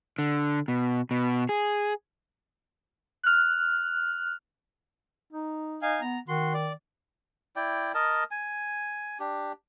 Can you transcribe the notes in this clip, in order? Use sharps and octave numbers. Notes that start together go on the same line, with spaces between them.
D3
B2
B2
G#4
F6 F#6
D#4
D#4 F5 G#5
B3 A#5
D#3 F#4 C6
D5
E4 D5 G5
A#4 D#5 A5
G#5
D4 G4